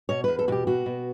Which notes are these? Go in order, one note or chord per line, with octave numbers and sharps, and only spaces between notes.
B2 C#5
E2 B4
A4
B2 F#4 G4
B2 F#4
B2